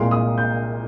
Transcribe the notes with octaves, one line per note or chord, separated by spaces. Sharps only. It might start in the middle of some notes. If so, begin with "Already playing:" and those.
Already playing: C2 A#2 G#3 C6
D#6
G6